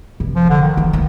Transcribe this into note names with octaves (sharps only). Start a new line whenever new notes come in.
F1
F3
D3
D#3
E3
D2